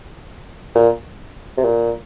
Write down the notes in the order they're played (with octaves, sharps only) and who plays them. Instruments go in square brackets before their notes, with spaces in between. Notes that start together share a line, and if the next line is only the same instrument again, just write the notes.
[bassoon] A#2
C3
A#2